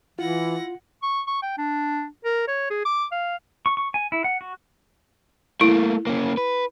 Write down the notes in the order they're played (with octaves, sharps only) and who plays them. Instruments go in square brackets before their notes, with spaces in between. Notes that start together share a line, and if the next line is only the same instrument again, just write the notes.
[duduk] E3 [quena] E4 [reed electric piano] F4 [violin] F#5 A#6
[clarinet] C#6
C#6
G5
D4
A#4
C#5
G#4
D6
F5
[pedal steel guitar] C#6
C#6
G#5
E4
F#5
F#4
[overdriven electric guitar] A3 A#3 [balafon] E4
[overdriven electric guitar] A#3 C#4
B4